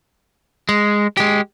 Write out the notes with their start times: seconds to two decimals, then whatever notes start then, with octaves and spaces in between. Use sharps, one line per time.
0.69 G#3
1.17 G#3 G4